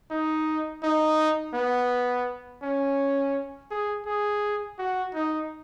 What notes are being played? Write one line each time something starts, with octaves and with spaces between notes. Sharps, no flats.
D#4
D#4
B3
C#4
G#4
G#4
F#4
D#4